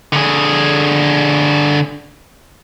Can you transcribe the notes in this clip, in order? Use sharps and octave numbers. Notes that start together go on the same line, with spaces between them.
D3 G#4